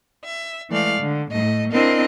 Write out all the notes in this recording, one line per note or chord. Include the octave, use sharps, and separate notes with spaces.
E5
E3 G#3 A3 D5 F5
D3
A2 A3 D#5
C4 D4 E4 A#4 D#5 F5